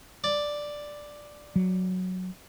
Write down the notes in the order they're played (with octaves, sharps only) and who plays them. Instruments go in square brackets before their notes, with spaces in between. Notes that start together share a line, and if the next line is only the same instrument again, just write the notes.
[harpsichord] D5
[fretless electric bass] F#3